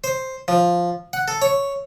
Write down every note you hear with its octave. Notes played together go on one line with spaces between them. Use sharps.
C5
F3
F#5
A4
C#5